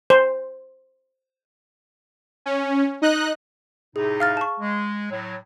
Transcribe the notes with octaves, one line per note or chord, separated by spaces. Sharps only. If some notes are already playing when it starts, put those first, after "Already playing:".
C5
C#4
D#4 D#5 F#6
A2 C3 D#4 G#4
F5 F6 A6
A5 C#6
G#3
A2 F#3